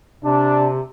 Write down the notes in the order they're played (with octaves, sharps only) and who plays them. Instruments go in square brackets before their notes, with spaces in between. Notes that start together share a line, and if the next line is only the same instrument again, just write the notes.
[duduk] C3 [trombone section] D4